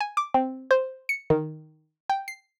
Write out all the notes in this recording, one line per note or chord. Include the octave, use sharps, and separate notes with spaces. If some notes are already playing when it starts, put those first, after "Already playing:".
G#5
D6
C4
C5
C#7
D#3
G5
C7